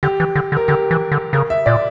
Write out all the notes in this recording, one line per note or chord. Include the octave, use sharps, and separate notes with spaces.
D3 G4
E3
D3
D3
A#4
D3 G4
E3
D3
C#3 A#4
E5
A#2 D5